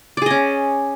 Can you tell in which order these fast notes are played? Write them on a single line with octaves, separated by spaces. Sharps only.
D5 G#4 D#5 C#4